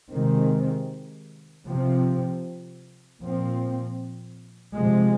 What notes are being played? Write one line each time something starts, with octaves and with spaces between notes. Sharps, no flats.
C3 D#3 G#3 C4
C3 F3 C4
A#2 F3 C4
C3 F3 G#3